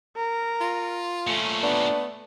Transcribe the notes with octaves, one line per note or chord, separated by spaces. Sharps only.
A#4
F4
A#2 A3 C#4
B3 D4